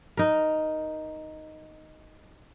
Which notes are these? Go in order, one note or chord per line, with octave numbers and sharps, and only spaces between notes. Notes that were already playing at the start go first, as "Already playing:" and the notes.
D#4 A#4